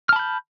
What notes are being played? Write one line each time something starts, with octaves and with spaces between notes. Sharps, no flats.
A5 B5 F6 G6